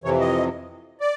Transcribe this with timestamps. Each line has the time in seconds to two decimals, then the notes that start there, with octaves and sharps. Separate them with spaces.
0.04 F2 C3 E3 C#5
0.21 D#5
1.00 D5